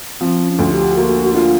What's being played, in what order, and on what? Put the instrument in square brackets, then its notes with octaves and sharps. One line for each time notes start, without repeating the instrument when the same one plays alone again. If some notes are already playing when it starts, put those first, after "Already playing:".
[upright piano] F3 [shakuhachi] C4
[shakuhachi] C#4
[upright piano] D2
[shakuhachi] G4
[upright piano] A#3 [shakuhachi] F#4
[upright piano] D3 [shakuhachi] F4